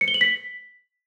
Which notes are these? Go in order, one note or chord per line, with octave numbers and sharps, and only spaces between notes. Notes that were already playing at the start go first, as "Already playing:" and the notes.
C#7
G7
F#7
B6